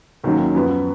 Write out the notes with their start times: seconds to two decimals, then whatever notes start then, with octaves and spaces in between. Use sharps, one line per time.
0.24 D#2 D#3 F#3 C#4
0.55 F#2 F3 B3